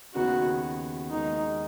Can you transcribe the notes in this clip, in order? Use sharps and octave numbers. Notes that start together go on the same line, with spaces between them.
D#2 C#3 B3 D#4 F#4
D#2 D#3 G#3 D#4